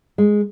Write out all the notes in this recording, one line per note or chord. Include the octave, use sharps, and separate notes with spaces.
G#3